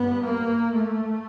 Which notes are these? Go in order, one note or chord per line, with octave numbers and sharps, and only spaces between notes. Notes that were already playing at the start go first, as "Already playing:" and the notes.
Already playing: G2 B3
A#3
A3